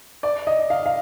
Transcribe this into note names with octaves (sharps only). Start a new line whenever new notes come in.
D5
D#5
F5
F5